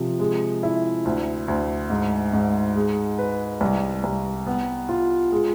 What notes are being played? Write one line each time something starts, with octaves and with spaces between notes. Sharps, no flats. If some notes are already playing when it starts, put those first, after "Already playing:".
Already playing: C3 F3
G#3
E4
D2
D2
G#2
G#2
G#3
B4
C2
C2
B3
F4
G#3